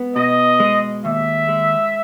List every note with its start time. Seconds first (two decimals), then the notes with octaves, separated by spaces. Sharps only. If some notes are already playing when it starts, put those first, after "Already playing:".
Already playing: G#3 B3
0.16 B2 D#5
0.60 G#3
1.04 D#2 E5
1.49 G#3